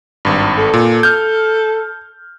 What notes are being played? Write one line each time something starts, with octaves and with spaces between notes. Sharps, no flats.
G#1 G2
A4
A#2
F6 G6